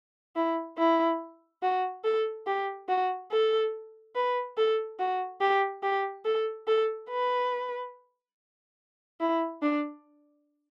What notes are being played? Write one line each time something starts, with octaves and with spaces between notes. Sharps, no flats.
E4
E4
F#4
A4
G4
F#4
A4
B4
A4
F#4
G4
G4
A4
A4
B4
E4
D4